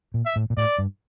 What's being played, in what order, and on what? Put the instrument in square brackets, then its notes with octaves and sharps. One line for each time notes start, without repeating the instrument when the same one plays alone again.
[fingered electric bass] A#2
[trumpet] E5
[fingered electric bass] A2
A#2
[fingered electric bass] A2 [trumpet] D5
[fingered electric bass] G2